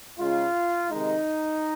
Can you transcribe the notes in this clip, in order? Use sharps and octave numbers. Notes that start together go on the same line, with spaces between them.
C#3 G#3 F4
C3 D#3 G#3 D#4